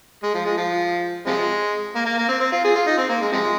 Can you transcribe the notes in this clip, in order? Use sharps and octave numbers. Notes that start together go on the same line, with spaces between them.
G#3
F3
G#3
F3
C3 F3 G#3
A#3
A#3
A#3
C4
C4
F4
G#4
F4
D#4
C4
A#3
G#3
C3 F3 G#3